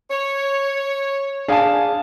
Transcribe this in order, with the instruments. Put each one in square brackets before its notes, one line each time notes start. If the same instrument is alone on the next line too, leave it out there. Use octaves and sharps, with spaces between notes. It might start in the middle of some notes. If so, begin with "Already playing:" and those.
[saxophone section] C#5
[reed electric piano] D4 G#4 [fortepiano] F5 G#5 A5